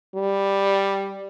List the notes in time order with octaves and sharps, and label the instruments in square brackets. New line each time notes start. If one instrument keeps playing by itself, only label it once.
[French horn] G3